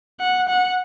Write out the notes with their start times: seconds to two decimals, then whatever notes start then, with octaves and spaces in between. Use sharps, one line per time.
0.20 F#5
0.49 F#5